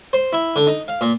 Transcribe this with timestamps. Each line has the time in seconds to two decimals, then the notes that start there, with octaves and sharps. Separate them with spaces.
0.13 C5
0.33 E4
0.56 D3
0.67 D#4
0.88 F5
1.01 A#2